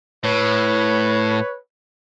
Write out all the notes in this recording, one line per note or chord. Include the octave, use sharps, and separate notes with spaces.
A2 B4 C#5